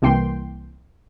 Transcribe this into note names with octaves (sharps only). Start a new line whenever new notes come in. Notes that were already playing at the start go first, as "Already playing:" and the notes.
C2 E3 A#3 G5 C6